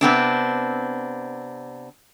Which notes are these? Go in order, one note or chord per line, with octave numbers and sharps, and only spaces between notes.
C3 B3 C4 D4